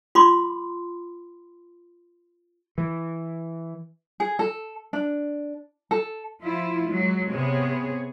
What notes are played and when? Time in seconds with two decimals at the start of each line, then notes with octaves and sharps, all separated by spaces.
0.15 F4 B5 C6 D6
2.78 E3
4.20 G#4
4.39 A4
4.93 D4
5.91 A4
6.43 F3 E4 F4
6.87 F#3 G#3
7.29 C3 B3 G#4 C#5